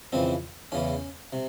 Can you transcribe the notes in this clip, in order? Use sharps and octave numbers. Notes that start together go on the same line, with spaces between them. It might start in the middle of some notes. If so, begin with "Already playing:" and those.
F2 C#3 E3 C4
E2 C#3 E3 C#4
C3